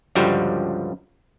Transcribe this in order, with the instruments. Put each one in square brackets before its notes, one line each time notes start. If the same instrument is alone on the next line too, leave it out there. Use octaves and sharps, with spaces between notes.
[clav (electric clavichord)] C#2 G2 D3 F3 G3 F#4